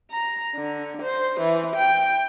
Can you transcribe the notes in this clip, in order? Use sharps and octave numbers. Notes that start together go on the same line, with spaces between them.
A#5
D3
C5
E3
G5